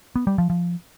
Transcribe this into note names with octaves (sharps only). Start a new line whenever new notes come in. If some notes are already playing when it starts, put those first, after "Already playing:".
B3
G3
F3
F3